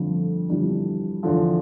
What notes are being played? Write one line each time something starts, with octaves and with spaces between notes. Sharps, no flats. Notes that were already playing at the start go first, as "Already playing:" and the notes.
Already playing: G1 F2 D3 F3 A3
G1 F2 E3 G3 D4
E2 D3 F3